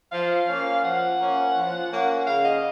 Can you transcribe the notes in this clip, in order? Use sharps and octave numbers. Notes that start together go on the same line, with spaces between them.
F3 F5
A#3 C#4
F3 F#5
A#3 C#4
F3
A#3 C#4
C#3 F5
D#5